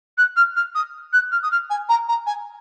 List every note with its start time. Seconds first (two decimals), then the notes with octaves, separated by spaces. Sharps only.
0.18 F#6
0.36 F6
0.56 F6
0.75 D#6
1.13 F#6
1.32 F6
1.43 D#6
1.52 F6
1.70 G#5
1.89 A#5
2.09 A#5
2.27 G#5